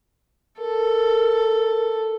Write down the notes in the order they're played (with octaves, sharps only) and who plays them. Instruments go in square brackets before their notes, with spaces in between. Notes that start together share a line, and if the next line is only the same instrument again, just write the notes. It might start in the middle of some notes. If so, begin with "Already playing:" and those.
[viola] A4 [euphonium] A#4